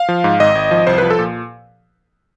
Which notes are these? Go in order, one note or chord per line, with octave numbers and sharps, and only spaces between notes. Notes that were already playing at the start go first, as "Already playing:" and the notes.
Already playing: F5
F3
G#2
G#1 D#5
G#1
F3
C2 C5
F3 B4
A4
A#2